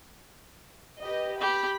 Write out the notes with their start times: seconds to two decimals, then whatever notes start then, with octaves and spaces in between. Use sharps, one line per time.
0.99 G4 B4 D#5
1.40 G4 B5